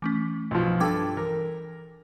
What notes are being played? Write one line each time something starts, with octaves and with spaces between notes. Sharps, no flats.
E3 A3 C#4
B1 F3
G2 A4 G5 D6 G#6
E3 A#4